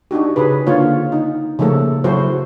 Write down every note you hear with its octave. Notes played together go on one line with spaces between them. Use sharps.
D4 D#4 F#4 G4
C#3 G#4 B4
D3 A#3 F4 C#5
D#4
C#3 F3 A3 A#3 A4
C#3 F#3 E4 F#4 A4 C5